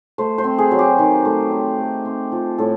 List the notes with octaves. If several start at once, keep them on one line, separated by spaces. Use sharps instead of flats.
A3 C5
C5
C4
G#4
F#3
G4
D#3
A3
C4
A3
C4
F3
A2 A4